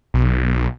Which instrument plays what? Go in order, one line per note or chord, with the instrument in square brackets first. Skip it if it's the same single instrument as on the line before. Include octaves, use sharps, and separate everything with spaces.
[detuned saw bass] B1